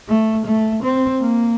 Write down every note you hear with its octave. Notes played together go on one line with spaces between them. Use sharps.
A3
A3
C4
A#3